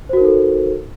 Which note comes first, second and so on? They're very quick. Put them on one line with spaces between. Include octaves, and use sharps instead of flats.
C5 F#4 A#4 D#4 A4